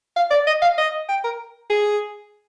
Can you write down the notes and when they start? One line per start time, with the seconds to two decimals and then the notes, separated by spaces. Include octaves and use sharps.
0.16 F5
0.31 D5
0.47 D#5
0.62 F5
0.78 D#5
1.09 G5
1.24 A#4
1.70 G#4